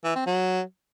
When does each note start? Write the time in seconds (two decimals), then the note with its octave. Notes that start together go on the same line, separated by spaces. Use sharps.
0.04 E3
0.15 C4
0.26 F#3